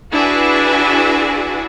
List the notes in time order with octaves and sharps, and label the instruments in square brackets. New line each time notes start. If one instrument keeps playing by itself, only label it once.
[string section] D4 E4 F#4 G#4 B4